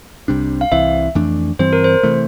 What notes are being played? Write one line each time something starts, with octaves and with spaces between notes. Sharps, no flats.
C2 C3 G3 D4
F5
C2 C3 E3 E5
F2 E3 A3 D4
G2 E3 G3 C4 C5
A#4
C5
C3 E3 A3